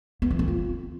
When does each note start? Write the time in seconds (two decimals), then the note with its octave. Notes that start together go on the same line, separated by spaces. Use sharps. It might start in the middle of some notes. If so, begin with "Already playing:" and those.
0.22 B3
0.31 E3
0.39 C4
0.48 F4